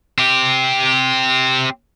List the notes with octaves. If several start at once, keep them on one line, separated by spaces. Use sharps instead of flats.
C4 G4